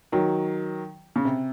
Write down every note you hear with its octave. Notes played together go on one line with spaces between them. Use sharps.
D#3 F#3
C#3
C3